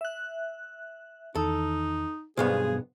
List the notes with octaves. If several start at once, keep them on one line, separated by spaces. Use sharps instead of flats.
E5 F#6
E2 D#3 D#4 A4
B1 G2 B3 G#4 C5